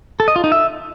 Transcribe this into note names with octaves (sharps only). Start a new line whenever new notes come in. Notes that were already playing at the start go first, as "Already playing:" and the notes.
A4
D#5
F4
D#4
E5